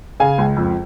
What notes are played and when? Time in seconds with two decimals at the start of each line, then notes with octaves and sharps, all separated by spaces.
0.20 C#3 F5 G#5
0.38 C#2
0.57 F2